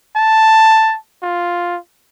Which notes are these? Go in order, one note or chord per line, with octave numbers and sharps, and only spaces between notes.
A5
F4